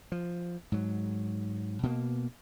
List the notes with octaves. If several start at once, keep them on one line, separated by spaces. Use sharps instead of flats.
F3
G#2 F#3
B2 A#3